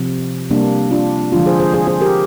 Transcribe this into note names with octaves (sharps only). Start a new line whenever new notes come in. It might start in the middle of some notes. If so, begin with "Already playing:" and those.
Already playing: C3 F3
C3 G3 A#3 D4
D4 F4
D3 F3 G#3 D4 F4
G#4 C5
G#4 C5
G#4 C5
G#4 C5
G4 A#4